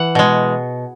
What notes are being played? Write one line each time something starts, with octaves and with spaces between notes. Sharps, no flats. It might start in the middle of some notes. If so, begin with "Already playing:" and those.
Already playing: E3 F#5
B2 G#3